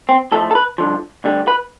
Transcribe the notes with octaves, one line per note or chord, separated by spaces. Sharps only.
C4
A2 F3 A3 A4
A4
B4
G2 D3 F3
D2 D3 G3
B4